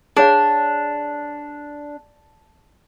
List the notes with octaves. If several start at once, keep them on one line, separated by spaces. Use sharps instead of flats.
D4 G#4 C#5 F5